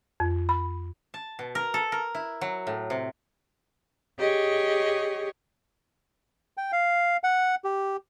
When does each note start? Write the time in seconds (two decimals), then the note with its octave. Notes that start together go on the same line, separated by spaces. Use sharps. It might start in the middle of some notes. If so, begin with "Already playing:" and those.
0.20 F2
0.49 B5
1.14 A5
1.39 B2
1.55 A#4
1.74 A4
1.92 A#4
2.15 E4
2.41 F#3
2.67 A2
2.90 C3
4.19 G4 G#4 C#5 D#5
6.57 G5
6.72 F5
7.24 F#5
7.64 G4